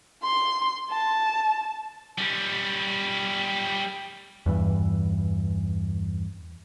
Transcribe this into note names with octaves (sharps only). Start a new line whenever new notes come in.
C6
A5
G3 C#4
E2 G2 E3